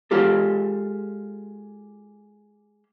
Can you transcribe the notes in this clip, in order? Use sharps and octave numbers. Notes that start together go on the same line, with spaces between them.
G#3 F4 G4 A4